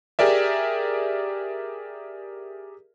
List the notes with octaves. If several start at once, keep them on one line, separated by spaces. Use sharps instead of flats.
G4 G#4 A#4 D5 E5